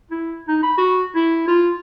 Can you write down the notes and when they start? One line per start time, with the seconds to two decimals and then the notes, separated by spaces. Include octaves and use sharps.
0.11 E4
0.48 D#4
0.63 B5
0.78 F#4
1.15 E4
1.48 F4